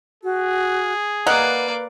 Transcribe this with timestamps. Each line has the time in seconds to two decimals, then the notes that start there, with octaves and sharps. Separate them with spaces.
0.24 F#4 G#4
1.27 A#3 A#4 B4 D5 D#5 F#5